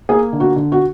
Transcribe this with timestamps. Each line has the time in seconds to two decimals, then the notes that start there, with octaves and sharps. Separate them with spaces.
0.09 A#3 G#4
0.33 D3
0.40 F#4
0.56 D3
0.72 F#4